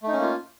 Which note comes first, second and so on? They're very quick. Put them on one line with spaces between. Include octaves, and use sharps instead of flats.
A3 D#4 C#4 A#3 F4